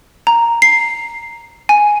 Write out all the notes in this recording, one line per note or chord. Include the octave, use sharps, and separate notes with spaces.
A#5
C7
G#5